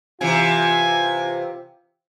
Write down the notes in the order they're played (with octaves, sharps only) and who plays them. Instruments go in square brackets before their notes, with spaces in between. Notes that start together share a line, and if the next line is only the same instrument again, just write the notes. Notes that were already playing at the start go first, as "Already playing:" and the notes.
[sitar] C3 E3 [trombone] F4 [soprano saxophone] G#5